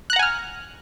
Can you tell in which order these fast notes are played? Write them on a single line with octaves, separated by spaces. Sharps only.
F#6 A#5 F#5 G#5 F6